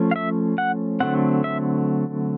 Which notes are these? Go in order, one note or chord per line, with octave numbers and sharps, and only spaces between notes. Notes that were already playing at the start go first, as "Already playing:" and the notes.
Already playing: F3 A3 C#4
F5
E5
F#5
D3 F#3 A3 C4 F#5
E5